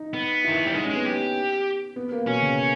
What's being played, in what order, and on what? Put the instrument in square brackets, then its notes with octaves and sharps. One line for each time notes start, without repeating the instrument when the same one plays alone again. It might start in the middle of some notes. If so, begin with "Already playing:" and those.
Already playing: [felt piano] D#4
[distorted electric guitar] B3
[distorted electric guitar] D#3 [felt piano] E4
[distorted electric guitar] E3
G3
[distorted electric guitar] G#3 [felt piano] D#4
[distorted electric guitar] G#3 [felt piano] C#4
[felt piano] B3
[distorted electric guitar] G4
[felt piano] B3
A#3
[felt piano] B2 [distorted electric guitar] C#4
[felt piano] C#3